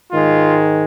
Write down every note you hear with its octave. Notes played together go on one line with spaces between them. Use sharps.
G#2 D#3 G#3 F4